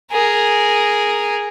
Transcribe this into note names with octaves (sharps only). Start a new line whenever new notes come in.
G#4 A#4